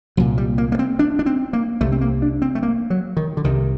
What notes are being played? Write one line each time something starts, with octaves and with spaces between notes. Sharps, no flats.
C2 A#2 F#3
G3
A#3
A#3
C4
D4
D4
C4
A#3
C2 C3 A3
C4
A#3
D4
C4
A3
A#3
F#3
D#3
D3
C2 C3 D#3